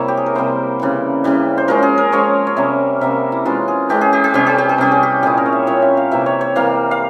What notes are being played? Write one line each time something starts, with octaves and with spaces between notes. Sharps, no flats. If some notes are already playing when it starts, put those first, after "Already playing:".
Already playing: C3 G3 A#3 E4 C#5 E5
G4
G#4
A#4
C3 G3 A#3 E4 C5
C#3 E3 G3
C#3 E3 G3
C5
F3 G#3 C#4 A#4
G#4
A#4
F3 G#3 C#4 C#5
C#5
C3 G3 A#3 C#4 E5
C3 G3 A#3 C#4 E5
E4
E3 G#3 C#4 F4
G#4
E3 G#3 C#4 G4
G#4
G4
G#4
C3 G3 C#4 G4
G#4
G4
G#4
C3 G3 C#4 G4
G#4
G4
A#2 G3 C#4 E4 G#4
A#4
C#5
E5
A#2 G3 C#4 E4 C#5
E5
F5
C3 E3 G3 A#3 E5
C#5
C#5
C3 E3 G3 A#3 F5
F5